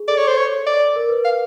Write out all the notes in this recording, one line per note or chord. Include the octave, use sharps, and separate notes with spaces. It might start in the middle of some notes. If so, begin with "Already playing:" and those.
Already playing: G#4
A4 D5
C#5
C5
C#5
D5
A#4
B4
F5